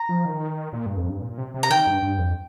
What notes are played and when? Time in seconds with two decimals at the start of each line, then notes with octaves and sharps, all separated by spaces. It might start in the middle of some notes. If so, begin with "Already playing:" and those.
Already playing: A#5
0.09 F3
0.25 D#3
0.73 A#2
0.86 G2
0.97 F2
1.09 G2
1.22 A#2
1.38 C3
1.54 C3
1.63 A#5
1.70 D#3 G5
1.87 G2
2.02 G2
2.18 F2